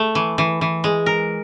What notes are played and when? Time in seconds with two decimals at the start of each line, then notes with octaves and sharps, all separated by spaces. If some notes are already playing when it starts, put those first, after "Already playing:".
Already playing: A3
0.15 E3
0.38 E3
0.61 E3
0.84 G#3
1.06 A#4